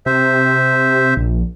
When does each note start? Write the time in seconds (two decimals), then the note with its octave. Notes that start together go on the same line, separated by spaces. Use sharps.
0.06 C3 C5 E5
1.17 A#1